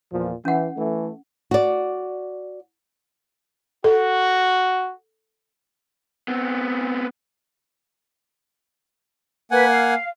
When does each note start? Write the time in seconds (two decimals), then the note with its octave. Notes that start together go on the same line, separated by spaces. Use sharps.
0.12 E2 A#2 F3
0.45 E3 C#4 F#5
0.77 E3 A3
1.51 F#4 D5
3.84 F#4 A4
6.28 B3 C4
9.51 A#3 B4 F#5 G#5
9.69 F5